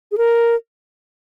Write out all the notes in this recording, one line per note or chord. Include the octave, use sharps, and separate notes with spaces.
G#4
A#4